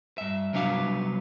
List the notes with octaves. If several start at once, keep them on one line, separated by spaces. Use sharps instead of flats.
G2 E5
C2 F#3 B3 D4 F5